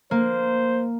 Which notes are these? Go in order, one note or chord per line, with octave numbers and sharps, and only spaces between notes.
A#3 C5